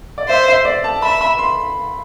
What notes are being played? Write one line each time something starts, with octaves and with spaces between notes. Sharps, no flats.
D5
C5 E5
E5
D5
A5
E5 B5
B5
C6